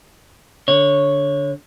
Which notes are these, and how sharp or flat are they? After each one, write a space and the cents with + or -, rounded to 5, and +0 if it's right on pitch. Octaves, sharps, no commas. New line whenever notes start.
D3 -15 C#5 +0